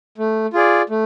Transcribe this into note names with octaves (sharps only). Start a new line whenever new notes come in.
A3
F4 G#4 D5
A3